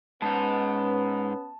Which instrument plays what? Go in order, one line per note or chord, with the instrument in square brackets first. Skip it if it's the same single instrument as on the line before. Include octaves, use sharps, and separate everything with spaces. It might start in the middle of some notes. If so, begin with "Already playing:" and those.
[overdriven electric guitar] G#2 D#4 [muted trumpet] B3 [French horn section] C#4 B4 [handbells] A5